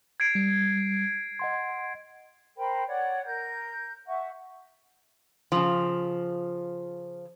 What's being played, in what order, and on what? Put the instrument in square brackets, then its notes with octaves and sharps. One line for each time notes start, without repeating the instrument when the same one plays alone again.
[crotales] G#6 C7 D7
[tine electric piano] G3
D#5 F#5 C6
[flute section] A#4 C5 G5 B5
C#5 D5 F#5
A#4 G6
E5 F#5 C#6
[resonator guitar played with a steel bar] C#3 F3